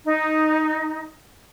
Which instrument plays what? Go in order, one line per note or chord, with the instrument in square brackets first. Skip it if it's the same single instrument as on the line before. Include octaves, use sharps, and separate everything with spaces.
[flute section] D#4